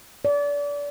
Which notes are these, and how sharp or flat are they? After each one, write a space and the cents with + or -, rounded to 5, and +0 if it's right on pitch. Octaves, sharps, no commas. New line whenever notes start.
D5 -30